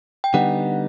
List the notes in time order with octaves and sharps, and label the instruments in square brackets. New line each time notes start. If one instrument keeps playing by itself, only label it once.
[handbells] G5
[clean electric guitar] D3 G3 B3 D#4 [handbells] F#5